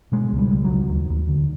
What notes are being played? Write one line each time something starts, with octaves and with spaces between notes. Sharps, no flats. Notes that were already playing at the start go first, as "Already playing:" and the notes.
B2 G#3
C#2
G3
C#2
F#3
C#2
D#2
D#2
D3